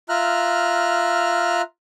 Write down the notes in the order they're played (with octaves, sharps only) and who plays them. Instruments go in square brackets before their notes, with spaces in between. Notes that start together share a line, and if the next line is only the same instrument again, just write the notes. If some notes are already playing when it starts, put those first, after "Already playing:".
[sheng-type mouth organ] F4 E5 A#5 F6 F#6